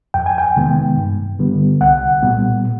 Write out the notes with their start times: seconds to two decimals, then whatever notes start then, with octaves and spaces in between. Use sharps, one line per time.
0.14 F2 G5
0.26 G#5
0.38 G5
0.55 C3 D#3 G#3 B3
0.97 G2
1.39 D3 G3 B3
1.81 C2 F#5
2.22 A#2 G3 B3